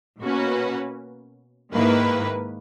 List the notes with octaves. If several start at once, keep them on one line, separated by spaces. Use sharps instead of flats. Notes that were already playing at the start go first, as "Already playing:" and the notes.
B2 A#3 C#4 F#4 B4
G#2 D#3 A#3 E4 B4